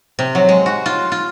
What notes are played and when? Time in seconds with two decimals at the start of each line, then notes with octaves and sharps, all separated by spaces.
0.19 C3
0.35 F#3
0.49 G#3
0.66 F#4
0.86 F4
1.12 F4